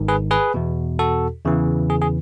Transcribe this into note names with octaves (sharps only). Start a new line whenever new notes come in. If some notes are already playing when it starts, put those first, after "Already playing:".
Already playing: G#1 G#2 D#3
G#4 B4
G#4 B4
E2 B2
F#4 A4
E2 C#3 E3
G#4
G#4